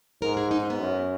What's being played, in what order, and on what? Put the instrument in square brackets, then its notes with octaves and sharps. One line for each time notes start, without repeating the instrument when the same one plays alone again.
[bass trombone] G#2 [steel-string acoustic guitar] A#4
[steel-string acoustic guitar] G#4
D#4
C#4
B3
[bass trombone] F#2